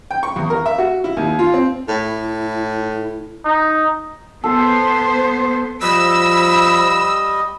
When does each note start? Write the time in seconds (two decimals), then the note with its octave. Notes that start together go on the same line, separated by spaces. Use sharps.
0.11 G5
0.23 C#6
0.36 E2
0.50 A#4
0.66 E5
0.78 F#4
1.04 E4
1.17 D#2
1.39 F4
1.54 C4
1.88 A2 E4
3.45 D#4
4.44 B3 A4 C5
5.82 F3 G3 D#5 B5 E6